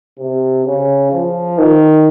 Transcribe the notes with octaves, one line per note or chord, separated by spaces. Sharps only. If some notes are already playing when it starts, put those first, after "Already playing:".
C3
C#3
F3
D#3